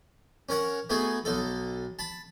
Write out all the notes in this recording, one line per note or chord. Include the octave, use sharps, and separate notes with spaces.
C#4 A#4 C#5 F#5
A3 B3 D#4 F#4 G#4
B1 D#4 A4
A5 B5